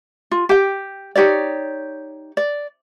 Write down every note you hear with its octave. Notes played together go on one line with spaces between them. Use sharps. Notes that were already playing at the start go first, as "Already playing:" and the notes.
F4
G4 G5
D#4 G4 C#5 D5
D5